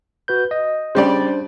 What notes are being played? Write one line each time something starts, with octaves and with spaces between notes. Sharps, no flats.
F#4 B4 G6
D#5
C#3 G3 D4 C5 D5